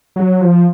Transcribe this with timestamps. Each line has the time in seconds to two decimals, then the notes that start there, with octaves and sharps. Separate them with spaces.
0.16 F#3
0.41 F3